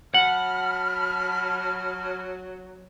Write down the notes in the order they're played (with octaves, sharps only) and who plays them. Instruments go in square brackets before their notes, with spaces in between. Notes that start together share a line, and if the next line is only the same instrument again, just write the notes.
[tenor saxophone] F#3 [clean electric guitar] F#5 [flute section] A5 B5 F6 [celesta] F#7